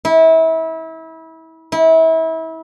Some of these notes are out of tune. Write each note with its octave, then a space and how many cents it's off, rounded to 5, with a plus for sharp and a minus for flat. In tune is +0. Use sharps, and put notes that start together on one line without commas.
E4 -30
E4 -30